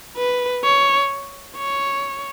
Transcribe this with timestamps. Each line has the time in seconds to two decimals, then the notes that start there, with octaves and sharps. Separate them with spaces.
0.17 B4
0.64 C#5
1.57 C#5